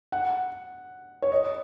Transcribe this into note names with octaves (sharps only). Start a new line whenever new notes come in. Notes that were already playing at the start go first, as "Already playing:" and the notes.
F#5
C#5
D#5